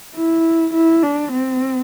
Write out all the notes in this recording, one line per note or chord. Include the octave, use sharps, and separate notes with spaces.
E4
E4
D4
C4